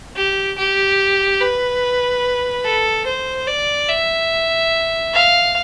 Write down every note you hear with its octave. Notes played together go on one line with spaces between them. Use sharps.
G4
G4
B4
A4
C5
D5
E5
F5